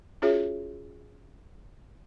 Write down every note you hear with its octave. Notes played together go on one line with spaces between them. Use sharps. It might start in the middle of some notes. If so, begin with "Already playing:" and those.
C#4 F4 F#4 G#4 C#5 E5